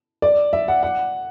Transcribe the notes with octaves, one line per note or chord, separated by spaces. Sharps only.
D5
E5
F#5
F#5